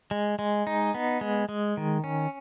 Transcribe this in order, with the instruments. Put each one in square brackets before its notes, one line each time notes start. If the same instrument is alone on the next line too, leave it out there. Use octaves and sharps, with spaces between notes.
[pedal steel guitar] G#3
G#3
D#4
B3
G#3
G#3
D#3
C#4